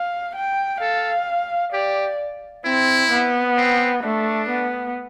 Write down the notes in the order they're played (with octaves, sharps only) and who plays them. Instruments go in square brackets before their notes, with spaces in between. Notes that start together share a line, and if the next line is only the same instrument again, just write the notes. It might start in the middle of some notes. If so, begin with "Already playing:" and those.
Already playing: [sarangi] F5
G5
[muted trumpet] A4 [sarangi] F5
[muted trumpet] G4 [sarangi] D5
[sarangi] C4 [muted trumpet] E4
[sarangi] B3
[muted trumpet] C4
[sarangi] A3 [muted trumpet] D4
[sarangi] B3